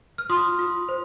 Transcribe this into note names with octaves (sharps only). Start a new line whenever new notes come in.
F6
F4 C6 D#6
F4
C5